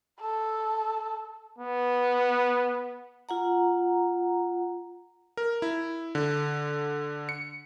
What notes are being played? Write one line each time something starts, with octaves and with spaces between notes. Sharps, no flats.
A4
B3
F4 F#5 A#5
A#4
E4
D3
C#7